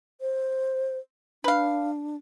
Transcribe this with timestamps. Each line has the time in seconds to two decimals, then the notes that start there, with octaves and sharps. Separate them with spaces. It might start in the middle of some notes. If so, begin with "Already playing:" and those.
0.21 C5
1.44 D4 B4 F5